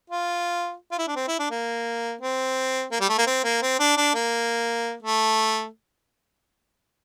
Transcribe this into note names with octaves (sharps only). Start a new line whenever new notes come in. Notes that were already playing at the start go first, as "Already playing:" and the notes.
F4
F4
E4
D4
C4
E4
D4
A#3
C4
A#3
G3
A3
A#3
C4
A#3
C4
D4
D4
A#3
A3